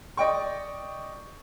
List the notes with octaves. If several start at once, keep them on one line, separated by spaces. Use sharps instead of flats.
D5 D#5 G5 C#6